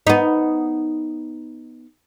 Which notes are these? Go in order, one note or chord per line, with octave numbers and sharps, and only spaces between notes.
B3 D#4